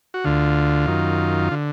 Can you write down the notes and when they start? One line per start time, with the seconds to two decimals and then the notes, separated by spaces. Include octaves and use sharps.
0.14 F#4
0.24 D2 D3 F4
0.87 F#2 D#3
1.51 D3